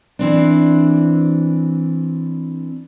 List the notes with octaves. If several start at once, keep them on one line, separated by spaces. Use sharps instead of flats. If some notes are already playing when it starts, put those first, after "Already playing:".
E3 C4 D4